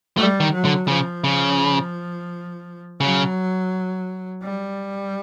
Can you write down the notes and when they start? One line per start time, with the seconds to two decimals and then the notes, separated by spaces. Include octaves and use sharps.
0.17 G3 A3
0.40 D#3
0.53 F#3
0.65 D3
0.88 C#3 F3
1.24 C#3
3.01 C#3 F#3
4.43 G3